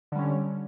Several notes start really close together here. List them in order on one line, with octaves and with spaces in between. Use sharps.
D3 G3 C#4